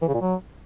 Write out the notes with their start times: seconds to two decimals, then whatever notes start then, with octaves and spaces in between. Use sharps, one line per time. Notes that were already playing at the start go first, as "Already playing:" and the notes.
0.01 E3
0.08 C#3
0.14 A#2
0.21 F#3